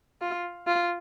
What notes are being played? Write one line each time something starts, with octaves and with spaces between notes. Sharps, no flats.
F4
F4